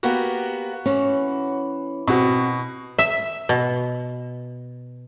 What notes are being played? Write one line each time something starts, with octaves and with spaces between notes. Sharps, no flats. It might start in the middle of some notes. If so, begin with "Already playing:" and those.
A#3 B3 F#4 G4
E3 C#4
B2 C4 F#4
E5
B2